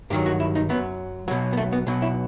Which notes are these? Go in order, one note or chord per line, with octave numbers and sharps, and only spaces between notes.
G2 D#3 F#3 G4
F#4
E4
D#4
F#2 F#3 B3
B1 B2 F#3
B3
A3
B3
B1 B2 F#3
E4